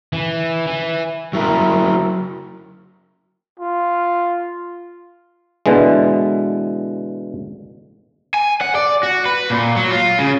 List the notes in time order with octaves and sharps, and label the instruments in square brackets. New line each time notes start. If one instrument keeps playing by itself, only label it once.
[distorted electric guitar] E3
E3
[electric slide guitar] F#3 E4 A#4
[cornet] F4
[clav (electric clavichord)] B2 D3 E3 G#3
[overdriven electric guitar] G#5
F#5
D5
F#4
B4
A#2
F#3
F4
C#3